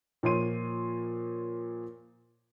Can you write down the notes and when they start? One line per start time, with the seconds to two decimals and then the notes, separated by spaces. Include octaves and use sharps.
0.23 A#2 F3 C#5 C6 D#7